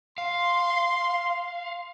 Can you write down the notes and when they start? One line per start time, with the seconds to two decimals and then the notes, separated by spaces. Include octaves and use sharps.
0.18 F5 C6